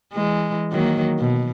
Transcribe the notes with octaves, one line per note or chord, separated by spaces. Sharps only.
E3 G#3
D#3 F#3 A#3
B2